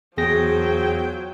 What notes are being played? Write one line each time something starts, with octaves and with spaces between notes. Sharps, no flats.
E2 F3 F#3 G#4 G5 A#6